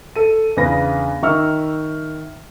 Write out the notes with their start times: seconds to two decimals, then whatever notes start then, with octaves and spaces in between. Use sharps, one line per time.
0.16 A4 D#7
0.57 E2 C#3 D4 B4 A#6
1.23 D#3 E5 C#6 E6 F6